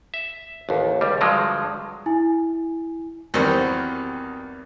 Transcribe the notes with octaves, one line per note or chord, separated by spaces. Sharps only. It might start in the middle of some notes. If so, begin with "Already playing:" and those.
E5
A1 D#2
C#2 G3
G2 D3 F3 F#3 G#3
E4 G#5
E2 D#3 F#3 G3 C4